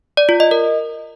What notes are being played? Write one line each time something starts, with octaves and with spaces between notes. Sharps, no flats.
D5
F4
D#5
A#4